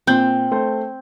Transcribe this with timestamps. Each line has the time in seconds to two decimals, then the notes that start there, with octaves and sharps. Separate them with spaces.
0.07 A#2 C4 G6 F#7
0.51 A3 C5